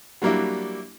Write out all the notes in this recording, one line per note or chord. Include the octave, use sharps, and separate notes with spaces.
F#3 G3 A#3 D4 E4